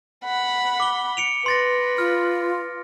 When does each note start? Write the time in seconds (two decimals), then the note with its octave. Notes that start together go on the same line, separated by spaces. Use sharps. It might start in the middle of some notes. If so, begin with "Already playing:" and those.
0.25 F#5 B5
0.80 D6 G7
1.17 C#7 D7 F7
1.46 B4 C6 A6 A#6
1.98 F4 F6